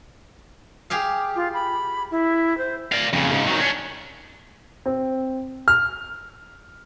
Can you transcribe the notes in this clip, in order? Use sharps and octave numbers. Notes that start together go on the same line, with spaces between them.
G4 G#4 F5
F4
B5
E4
C5
D5 F5
F2 C#3
G#2 C#3
D#3 F#3
C#4 D4
C4
F6